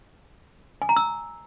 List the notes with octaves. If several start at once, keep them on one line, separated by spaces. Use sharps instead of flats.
G#5
A#5
E6